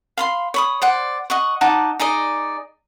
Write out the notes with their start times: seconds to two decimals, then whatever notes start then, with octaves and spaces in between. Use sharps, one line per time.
0.18 F5 B5 C6
0.54 C#5 B5 D#6
0.82 C5 D5 F#5
1.30 D#5 F#5 C#6
1.61 D#4 F#5 A5 D6
1.99 D#4 G#4 D5 D#5